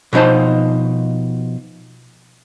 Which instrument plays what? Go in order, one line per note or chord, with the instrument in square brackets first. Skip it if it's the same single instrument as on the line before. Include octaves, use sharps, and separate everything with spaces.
[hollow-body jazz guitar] B2 F3 D#4 C5 A5